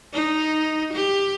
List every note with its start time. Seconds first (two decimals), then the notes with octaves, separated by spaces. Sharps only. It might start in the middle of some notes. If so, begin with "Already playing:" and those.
0.13 D#4
0.93 G4